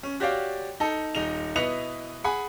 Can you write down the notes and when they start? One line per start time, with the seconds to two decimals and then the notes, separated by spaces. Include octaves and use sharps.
0.03 C#4
0.20 F#4 G4 C#5 D5 F5 G5
0.80 D#4 A4
1.15 D#1 D#4 F7
1.56 B2 E4 B4 D#5 C#7 F7
2.24 G#4 F#5 G#5 B5